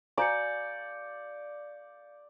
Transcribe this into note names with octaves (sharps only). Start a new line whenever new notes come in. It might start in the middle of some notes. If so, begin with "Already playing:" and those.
F#4 D5 F5 G#5 A#5 G6 C#7